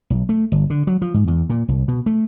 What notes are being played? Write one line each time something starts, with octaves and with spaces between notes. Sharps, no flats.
B1
A3
G1
D3
F#3
F3
G#2
E2
A#2
C2
B2
A3